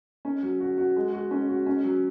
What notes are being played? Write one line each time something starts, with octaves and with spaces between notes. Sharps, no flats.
C#4
F#3
F#4
F#4
G#3
F#4
C#4
F#4
C#4
F#3